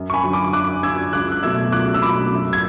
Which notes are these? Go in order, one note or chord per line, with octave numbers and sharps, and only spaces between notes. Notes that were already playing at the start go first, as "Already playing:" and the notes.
Already playing: F#2
C#6
G#5 B5
D3 F#3
B5 D6
F#2 D6 F#6
D3 F#3 E6 G#6
C#2 D6 F#6
F#6
B2 F#3 A3 E6 G#6
C#2 D6 F#6
E6
B2 F#3 A3 B5 D6
F#2
G#6